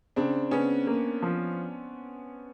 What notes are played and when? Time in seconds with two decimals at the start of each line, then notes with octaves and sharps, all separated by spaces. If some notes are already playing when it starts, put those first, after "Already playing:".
0.16 C#3 C4 D4
0.51 C#3 B3 C#4
0.87 A#3
1.22 F3